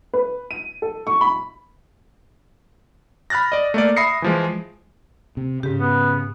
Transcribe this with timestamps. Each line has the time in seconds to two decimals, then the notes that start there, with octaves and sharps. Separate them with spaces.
0.14 B4
0.51 D#7
0.82 A4
1.07 C#6
1.21 B5
3.30 B5 F6 F#6 A6 A#6
3.52 D5 D#5
3.74 A3 A#3 D5
3.96 E5 B5 D#6 A#6 C7 C#7
4.22 E3 F3 G#3
5.37 C3
5.63 G#2 C#3 G4
5.80 B3